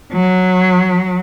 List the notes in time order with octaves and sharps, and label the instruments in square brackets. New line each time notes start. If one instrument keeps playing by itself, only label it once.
[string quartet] F#3